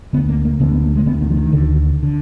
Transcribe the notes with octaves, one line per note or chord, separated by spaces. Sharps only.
D2 D3 B3
A#3
A#3
D2 D3 B3
B3
A#3
G#3
D2 D3 B3
D#3
F3
D#3
D2 D3
D3